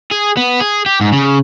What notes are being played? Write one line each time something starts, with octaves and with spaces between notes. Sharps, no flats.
G#4
B3
G#4
G4
G#2
C#3